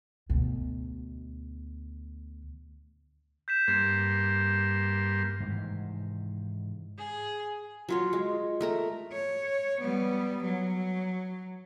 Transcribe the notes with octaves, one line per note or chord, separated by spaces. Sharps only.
D2 B2
G6 B6 E7
G2 A#3 C6 G6 G#6
G#2 C3 D#3 E3
G#4
F#3 F4 C#5
G#3
A3 A#4 A#5
C#5
G3 B3
F#3